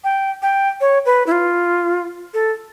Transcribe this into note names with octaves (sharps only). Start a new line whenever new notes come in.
G5
G5
C#5
B4
E4
F4
A4